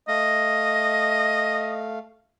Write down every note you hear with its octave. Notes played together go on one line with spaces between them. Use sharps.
A3 D#5 F5